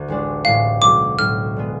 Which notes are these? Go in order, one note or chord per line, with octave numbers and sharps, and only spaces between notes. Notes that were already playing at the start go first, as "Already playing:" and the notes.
Already playing: D2
A1 A2 G#3 D4
A1 A2 G#3 D4 F5
B1 A2 F#3 D6
B1 A2 F#3 F6
D3 G#3 B3